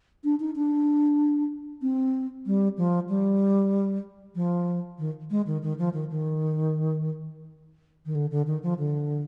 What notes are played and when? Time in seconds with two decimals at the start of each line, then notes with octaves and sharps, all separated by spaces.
0.24 D4
0.40 D#4
0.55 D4
1.82 C4
2.46 G3
2.77 F3
3.09 G3
4.35 F3
4.98 D#3
5.31 G#3
5.46 D#3
5.62 D#3
5.78 F3
5.93 D#3
6.10 D#3
8.06 D#3
8.15 D3
8.31 D3
8.47 D#3
8.63 F3
8.78 D3